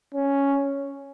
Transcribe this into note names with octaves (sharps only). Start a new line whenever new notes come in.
C#4